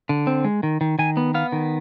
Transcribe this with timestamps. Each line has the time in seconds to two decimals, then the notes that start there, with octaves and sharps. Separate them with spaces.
0.09 D3
0.27 C4
0.45 G#3
0.63 D#3
0.81 D#3
0.99 D#3 G#5
1.17 B3
1.34 B3 F5
1.52 D#3